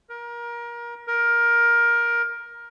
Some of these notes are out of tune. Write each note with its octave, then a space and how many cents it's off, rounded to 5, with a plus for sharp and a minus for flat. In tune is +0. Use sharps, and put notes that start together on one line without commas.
A#4 +25
A#4 +15